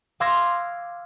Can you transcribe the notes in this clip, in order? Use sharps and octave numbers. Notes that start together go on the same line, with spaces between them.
F5 C6 D6 E6 G#6 A#6